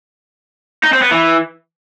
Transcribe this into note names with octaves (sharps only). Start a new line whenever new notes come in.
D#4
C4
B3
E3